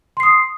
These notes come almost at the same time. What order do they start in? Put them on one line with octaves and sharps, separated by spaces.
C6 C7 D#6